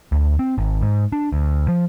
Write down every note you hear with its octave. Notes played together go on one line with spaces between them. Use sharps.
D2
C4
G#1
G#2
D4
D2
F3